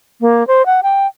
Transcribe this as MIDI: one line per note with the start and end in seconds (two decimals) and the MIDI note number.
0.21 0.46 58
0.47 0.65 72
0.66 0.81 78
0.83 1.07 79